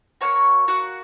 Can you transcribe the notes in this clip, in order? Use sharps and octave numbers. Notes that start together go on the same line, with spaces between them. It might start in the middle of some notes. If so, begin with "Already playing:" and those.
A#3 C#4 F#4 C#5 C#6
F#4 F#5